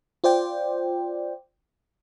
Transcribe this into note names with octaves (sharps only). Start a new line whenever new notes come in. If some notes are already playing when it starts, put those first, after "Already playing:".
F4 C5 D5 G5